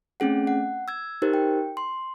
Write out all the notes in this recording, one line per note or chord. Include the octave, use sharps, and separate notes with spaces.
A3 C4 C#4 G#4 F#5
F#5
E6 G#6
D#4 G4 A#4 C5
G5
C6